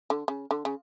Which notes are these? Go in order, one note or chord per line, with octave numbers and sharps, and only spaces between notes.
D3
C#3
D3
C#3